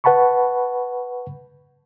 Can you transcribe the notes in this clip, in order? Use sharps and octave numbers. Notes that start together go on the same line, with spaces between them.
B4 F#5 A5 B5 C#6